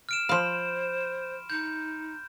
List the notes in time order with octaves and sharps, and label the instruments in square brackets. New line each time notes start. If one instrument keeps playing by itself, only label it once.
[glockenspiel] F6 D7 E7
[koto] F3 F5 [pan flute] C5 [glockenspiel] B5 C6 E7
[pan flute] D#4 [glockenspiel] G6